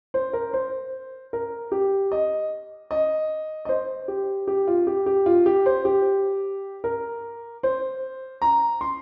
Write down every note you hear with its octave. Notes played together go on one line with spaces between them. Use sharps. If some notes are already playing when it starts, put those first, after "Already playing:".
C5
A#4
C5
A#4
G4
D#5
D#5
D#5
C5
G4
G4
F4
G4
G4
F4
G4
C5
G4
A#4
C5
A#5
C6